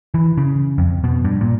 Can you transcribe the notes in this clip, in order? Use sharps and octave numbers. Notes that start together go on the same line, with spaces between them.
E3
C#3
F2
B2
G2
A#2